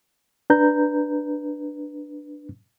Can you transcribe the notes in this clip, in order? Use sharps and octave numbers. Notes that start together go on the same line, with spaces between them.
D4 B4 A#5 G6